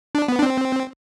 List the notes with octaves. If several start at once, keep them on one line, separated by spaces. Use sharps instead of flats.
D4
B3
D4
C4